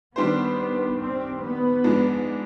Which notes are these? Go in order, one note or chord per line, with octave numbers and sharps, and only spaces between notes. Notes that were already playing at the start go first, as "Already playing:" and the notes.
D#3 G3 B3 D4 G4 C5
C4
B3
G#2 F3 G#3 D4